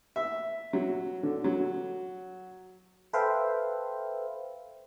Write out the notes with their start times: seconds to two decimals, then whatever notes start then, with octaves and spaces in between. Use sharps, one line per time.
0.16 E5
0.73 F#3
1.23 D3
1.44 F#3
3.13 A4 B4 C5 E5 F5 G5